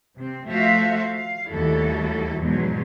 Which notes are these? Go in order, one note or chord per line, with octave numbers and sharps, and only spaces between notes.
C3 C4
F3 A3 F#4 C5 E5 F5
F5
D#2 G3 A3 E4 F#4 A4
E2 G#2 B2 F3 F#3 G#3